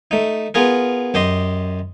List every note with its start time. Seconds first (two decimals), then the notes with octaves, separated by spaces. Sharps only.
0.11 A3 D#4
0.54 B3 F4 G#4 A#4
1.14 F#2 G4 D#5 C6